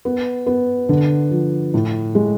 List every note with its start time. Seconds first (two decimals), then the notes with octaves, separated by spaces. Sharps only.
0.05 B3
0.47 B3
0.89 D3
1.31 F3
1.74 A2
2.15 G#3